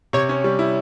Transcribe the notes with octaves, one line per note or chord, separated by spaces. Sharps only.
C3 C#5
C#4
G3
E4